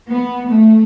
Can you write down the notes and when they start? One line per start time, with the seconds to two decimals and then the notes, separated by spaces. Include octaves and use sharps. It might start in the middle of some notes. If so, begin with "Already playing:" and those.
0.12 B3
0.50 A3